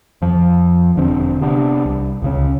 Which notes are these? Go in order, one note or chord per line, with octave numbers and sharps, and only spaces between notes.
F2 F3
E1 D3 C4
C3 B3 D4
C2
C#2 C#3 C#4